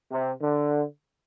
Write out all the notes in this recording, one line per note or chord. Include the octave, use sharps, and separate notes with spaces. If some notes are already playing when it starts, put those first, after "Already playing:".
C3
D3